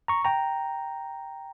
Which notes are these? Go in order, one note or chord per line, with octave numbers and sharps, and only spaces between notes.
A#5 C#6
G5 A#5